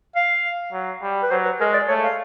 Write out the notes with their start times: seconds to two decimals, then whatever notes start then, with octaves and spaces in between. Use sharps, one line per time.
0.16 F5
0.73 F#3
1.02 G3
1.23 B4
1.31 F#3 C5
1.45 B4
1.60 G#3 A#4
1.74 D5
1.89 A3 C#5
2.03 F5